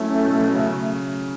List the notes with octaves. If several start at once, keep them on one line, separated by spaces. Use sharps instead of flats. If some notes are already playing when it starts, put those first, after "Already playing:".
Already playing: F#3 A3 C#4 E4
C#4
B2
F#3
C#3